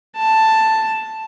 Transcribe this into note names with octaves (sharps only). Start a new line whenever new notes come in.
A5